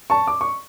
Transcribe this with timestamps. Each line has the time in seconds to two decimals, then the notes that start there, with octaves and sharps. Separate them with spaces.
0.10 A5 C#6
0.27 D6
0.41 C#6